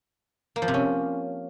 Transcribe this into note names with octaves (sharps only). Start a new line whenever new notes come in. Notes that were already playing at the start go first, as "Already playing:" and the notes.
A#3
F3
C3
C#4